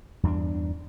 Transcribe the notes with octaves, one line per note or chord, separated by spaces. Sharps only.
E2 G2 C4 D4